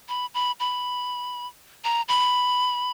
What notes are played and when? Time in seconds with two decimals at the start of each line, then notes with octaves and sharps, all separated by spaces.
0.09 B5
0.34 B5
0.60 B5
1.84 A#5
2.09 B5